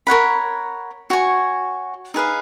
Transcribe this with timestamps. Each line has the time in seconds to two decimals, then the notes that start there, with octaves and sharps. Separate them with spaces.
0.07 A#4 C#5 F#5 B5
1.10 F#4 C#5 G#5 C#6
2.14 D#4 G#4 B4 F5